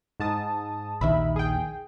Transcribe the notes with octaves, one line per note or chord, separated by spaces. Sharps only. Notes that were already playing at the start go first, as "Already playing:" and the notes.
G#2 A5 D#6
A#1 D#2 D#3 E5 B5
G#4 G5